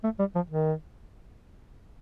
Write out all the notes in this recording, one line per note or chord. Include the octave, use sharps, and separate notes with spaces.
A3
G3
F3
D#3